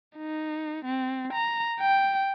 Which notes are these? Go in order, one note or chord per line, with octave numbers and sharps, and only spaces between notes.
D#4
C4
A#5
G5